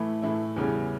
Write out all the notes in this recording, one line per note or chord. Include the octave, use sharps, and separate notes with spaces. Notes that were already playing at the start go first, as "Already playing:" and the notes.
Already playing: A2 E3 A3 E4
A2 E3 A3 E4
E2 C#3 E3 G3 C#4